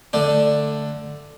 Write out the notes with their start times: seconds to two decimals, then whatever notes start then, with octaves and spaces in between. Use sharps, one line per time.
0.13 D3 A3 D4